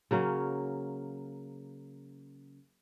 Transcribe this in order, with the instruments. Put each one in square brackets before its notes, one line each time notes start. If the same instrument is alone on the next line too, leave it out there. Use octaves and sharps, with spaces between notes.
[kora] C#3 F#3 A#3 C#4